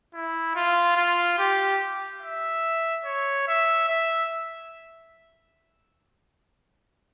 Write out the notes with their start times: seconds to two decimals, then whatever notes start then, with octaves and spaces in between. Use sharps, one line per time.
0.14 E4
0.55 F4
0.96 F4
1.38 G4
2.22 E5
3.05 C#5
3.47 E5
3.89 E5